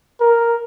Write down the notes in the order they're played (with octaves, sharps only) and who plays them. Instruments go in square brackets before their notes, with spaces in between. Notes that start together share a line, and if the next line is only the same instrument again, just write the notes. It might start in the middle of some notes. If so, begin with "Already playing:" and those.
[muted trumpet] A#4